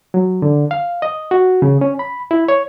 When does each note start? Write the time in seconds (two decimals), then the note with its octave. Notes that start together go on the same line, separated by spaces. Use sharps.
0.14 F#3
0.42 D3
0.71 F5
1.02 D#5
1.31 F#4
1.62 C#3
1.81 C#4
1.99 B5
2.31 E4
2.48 C#5